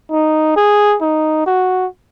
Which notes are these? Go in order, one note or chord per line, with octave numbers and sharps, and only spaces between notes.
D#4
G#4
D#4
F#4